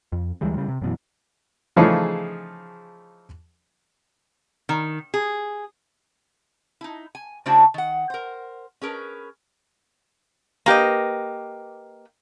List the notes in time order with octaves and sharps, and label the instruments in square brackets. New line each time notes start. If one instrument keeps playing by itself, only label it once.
[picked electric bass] F2
D2 E3 G3 G#3
C#3 G3
C3
F#2 B2 E3
[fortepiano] C#3 E3 F3 A3 D#4 G#4
[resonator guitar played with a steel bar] D#3
G#4
D#4 E4
G#5
C#3 A3 D4 E4 F#4 C5
D#3 F#5
A#4 C5
C#4 G#4 A#4 B4
A#3 G4 B4 D#5